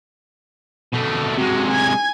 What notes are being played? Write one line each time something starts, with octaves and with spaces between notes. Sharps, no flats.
B2 A3
C3 G#3 F#4
G#5 G#6